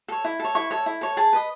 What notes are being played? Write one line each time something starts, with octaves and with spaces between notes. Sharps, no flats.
A4 C#5
E4
A4 C#5
E4 C#6
A4 C#5
E4
A4 C#5
G#4 A5
B4 D#5